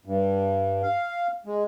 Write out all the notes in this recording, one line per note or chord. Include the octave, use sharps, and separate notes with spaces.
G2
F5
G#3